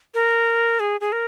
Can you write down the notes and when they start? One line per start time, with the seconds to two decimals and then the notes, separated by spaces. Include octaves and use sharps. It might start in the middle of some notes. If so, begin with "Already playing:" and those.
0.14 A#4
0.80 G#4
1.01 G#4
1.12 A#4